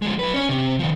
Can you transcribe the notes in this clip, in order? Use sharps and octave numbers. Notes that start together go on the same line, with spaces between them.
F3 G#3
F#3 B4
C#4 C#5
C3
D#3 F3